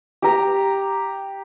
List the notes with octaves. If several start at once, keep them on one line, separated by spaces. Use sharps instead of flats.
G4 A#5